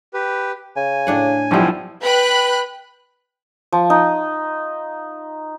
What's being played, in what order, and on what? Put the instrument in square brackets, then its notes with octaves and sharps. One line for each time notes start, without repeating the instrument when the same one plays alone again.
[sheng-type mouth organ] G4 B4
[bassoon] C#3 [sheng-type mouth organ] G#5
[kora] A2 D4 F#5
[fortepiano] B1 F3 E4 [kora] D#3 G3
[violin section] B4 G5 B5 F#6
[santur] F3
D#4